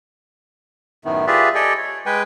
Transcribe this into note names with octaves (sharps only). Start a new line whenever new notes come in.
F#2 A2 D#3 A3 B3
F4 G4 G#4 B4 D5 E5
G4 A4 D5 D#5 G5 G#5
C#5
G#3 B4 G5 G#5